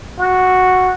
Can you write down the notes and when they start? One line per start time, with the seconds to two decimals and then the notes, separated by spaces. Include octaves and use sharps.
0.19 F#4